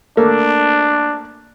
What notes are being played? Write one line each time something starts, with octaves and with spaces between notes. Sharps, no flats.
A3 A#3 D4